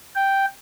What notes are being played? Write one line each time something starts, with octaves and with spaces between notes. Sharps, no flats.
G5